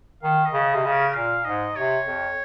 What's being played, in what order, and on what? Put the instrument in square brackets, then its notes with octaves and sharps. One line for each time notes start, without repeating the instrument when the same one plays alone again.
[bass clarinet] D#3 [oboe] F5
[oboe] D#5
[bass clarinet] C#3
[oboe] D#5
[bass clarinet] C3
C#3
[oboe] A#4
[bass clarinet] A#2 [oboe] F5
[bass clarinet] G#2 [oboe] D#5
[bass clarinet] C3 [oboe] C#5
[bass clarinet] F2